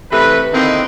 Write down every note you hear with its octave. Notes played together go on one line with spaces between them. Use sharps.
C3 E3 A3 B4
D3 D#3 A#3 C4 D#4 E4